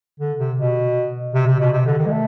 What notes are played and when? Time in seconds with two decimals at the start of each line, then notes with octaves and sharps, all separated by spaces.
0.20 D3
0.39 C3
0.58 B2
1.35 C3
1.47 C3
1.59 B2
1.73 C3
1.86 D3
1.98 D#3
2.06 G#3
2.11 A3